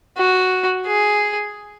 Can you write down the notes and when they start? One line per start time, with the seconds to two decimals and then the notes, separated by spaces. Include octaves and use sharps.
0.17 F#4
0.86 G#4